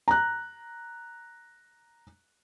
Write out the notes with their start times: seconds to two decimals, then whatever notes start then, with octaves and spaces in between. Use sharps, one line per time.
0.08 A#5 F#6